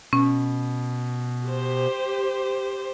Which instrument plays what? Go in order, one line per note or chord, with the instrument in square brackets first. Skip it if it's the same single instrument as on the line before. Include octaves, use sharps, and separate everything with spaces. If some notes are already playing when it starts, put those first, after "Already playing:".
[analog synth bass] B2 [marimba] C#4
[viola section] G4 C5